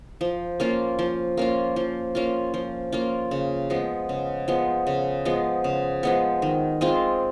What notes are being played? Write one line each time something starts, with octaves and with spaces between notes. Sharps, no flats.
F3
A#3 C#4 F4
F3
A#3 C#4 F4
F3
A#3 C#4 F4
F3
A#3 C#4 F4
C#3
F3 G#3 B3
C#3
F3 G#3 B3
C#3
F3 G#3 B3
C#3
F3 G#3 B3
D#3
G#3 C4 F4